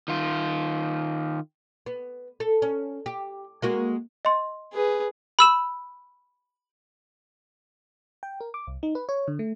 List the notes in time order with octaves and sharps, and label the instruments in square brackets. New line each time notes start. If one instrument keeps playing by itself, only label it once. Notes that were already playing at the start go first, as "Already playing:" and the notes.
[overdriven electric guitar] D#3 F4
[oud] B3
A4
C#4
G4
G#3 A#3 F#4
[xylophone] D#5 C6
[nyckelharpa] G#4 B4
[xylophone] B5 E6 E7
[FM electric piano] G5
A#4
D6
C2
D#4
B4
C#5
D3
A3